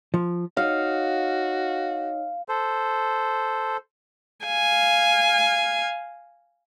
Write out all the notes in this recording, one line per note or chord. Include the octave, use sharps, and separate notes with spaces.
F3
D#4 F#4 C#5 D#5 F5
A4 C5
F5 G#5